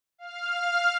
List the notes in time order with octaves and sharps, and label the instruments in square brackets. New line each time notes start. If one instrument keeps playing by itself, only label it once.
[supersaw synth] F5 F6